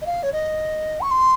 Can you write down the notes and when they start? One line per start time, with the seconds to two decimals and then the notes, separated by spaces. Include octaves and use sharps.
0.02 D#5
0.06 F5
0.23 C#5
0.33 D#5
1.01 C#6
1.11 C6